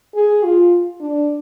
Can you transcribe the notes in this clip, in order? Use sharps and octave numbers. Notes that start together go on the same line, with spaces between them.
G#4
F4
D4